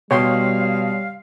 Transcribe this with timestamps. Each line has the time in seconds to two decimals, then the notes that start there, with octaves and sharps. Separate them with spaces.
0.11 B2 G3 C#5 F5 G5 C6